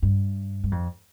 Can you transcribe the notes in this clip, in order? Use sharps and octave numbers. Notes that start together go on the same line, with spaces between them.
G2
G2
F2